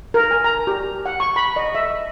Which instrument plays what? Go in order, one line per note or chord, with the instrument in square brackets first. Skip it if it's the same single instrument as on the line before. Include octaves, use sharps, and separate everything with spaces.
[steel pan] A#4
G#5
A#5
G4
F#5
C#6
B5
D#5
E5